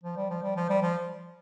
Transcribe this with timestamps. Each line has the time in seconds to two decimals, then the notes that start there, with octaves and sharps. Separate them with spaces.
0.03 F3
0.17 G3
0.30 F3
0.42 G3
0.56 F3
0.70 G3
0.82 F3